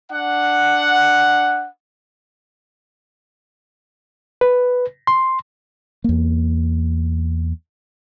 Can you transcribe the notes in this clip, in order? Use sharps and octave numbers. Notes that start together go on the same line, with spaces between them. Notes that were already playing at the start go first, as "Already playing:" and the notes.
D4 F#5
B4
C6
E2 A#3